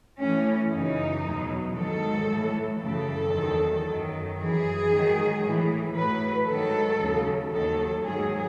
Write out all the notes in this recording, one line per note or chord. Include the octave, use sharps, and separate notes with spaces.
A2 E3 C#4
F#2 C#3 E3 D#4
E2 B2 F#3
G#2 D#3 F#3 A4
A2 E3
F#2 C#3 E3 A4
E2 D#3 F#3
F#2 D#3 F#3
F#2 E3 G#4
G#2 D#3 F#3
A2 E3
A2 F#3 B4
G#2 D#3 F#3 A4
D#2 C#3 F#3
D#2 D#3 F#3 A4
G#2 D#3 F#3 G#4